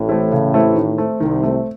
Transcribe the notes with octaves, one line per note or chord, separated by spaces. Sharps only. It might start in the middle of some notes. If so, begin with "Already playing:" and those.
Already playing: A1 A2
E3 A3 C4 E4
C#3
E3 A3 C4 E4
D#3
A3 C4
C2 C3 D#3
A3 C4